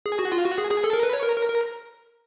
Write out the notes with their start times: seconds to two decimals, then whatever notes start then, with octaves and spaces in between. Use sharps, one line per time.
0.06 G#4
0.19 F#4
0.32 F4
0.45 F#4
0.58 G#4
0.71 G#4
0.84 A4
0.93 A#4
1.03 B4
1.13 C#5
1.23 A#4
1.36 A#4
1.49 A#4